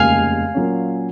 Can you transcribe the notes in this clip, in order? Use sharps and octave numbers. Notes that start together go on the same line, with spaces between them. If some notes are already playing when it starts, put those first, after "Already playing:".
Already playing: F1 D#2 C#3 G#3 F5 G#5
A#2 F#3 C#4